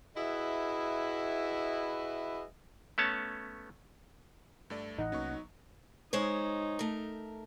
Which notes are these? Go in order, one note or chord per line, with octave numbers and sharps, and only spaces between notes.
E4 F#4 G#4 B4 D#5 E5
A3 B3 C#4 C#5 A5
G2 A3 D5
A1 E3 D#4 D#5 F#5
C2 F#3 A#3 B3 C#4 C#6
G#3 D#4 C5 C#5
A3 A#4